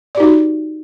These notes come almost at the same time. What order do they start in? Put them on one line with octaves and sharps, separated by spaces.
D5 G4 D#4 F#4